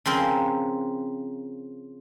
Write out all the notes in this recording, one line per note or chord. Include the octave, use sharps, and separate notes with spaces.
C#3 F3 C4 A#4